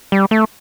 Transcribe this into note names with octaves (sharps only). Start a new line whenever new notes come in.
G3
A3